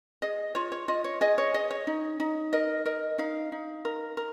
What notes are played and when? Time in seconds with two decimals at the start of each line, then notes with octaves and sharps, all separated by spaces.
0.22 G#4 D#5
0.55 F4 C#5
0.72 C#5
0.88 F4 D#5
1.04 C#5
1.21 G#4 D#5
1.38 C#5
1.54 G#4 D#5
1.71 C#5
1.87 D#4
2.20 D#4
2.53 A#4 D#5
2.85 A#4 D#5
3.18 D#4 F5
3.52 D#4
3.85 A#4
4.17 A#4